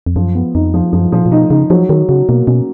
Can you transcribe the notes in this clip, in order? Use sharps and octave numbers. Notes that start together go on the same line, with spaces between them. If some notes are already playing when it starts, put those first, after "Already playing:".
F2
F#2 F3
B3
F2 D#4
F3
F#2 F3
A#2 F3
A#2
B2 D#4
C#3 D#4
F3 F#3
D#3 F#3
C#3 F#4
B2 A#3
B2 C#4